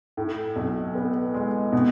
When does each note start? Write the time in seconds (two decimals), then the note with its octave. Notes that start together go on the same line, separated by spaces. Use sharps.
0.17 A2
0.56 B1
0.95 B3
1.34 G#3
1.72 B2